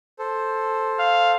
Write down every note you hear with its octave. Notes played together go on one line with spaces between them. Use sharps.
A4 C5
F5